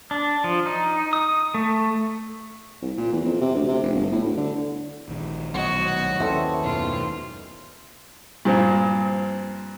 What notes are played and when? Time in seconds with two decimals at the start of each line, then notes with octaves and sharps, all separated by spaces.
0.11 D4
0.44 F3
0.66 D#4
1.13 D#6
1.54 A3
2.82 C2
2.98 A#2
3.13 E2
3.25 F2
3.41 C3
3.55 D2
3.68 C3
3.83 F1
3.95 G1
4.12 A2
4.25 D2
4.37 D3
5.08 A#1 D#3
5.54 B1 F#4 C#5 D#5
6.20 D#2 E3 G#3 C4 C#4 A4
6.63 F#2 B2 D#3 F4
8.45 G2 A#2 F3 C4